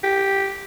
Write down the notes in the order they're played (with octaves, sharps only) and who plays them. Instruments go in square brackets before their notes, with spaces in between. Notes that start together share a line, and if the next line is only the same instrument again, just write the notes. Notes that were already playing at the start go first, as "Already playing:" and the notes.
[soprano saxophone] G4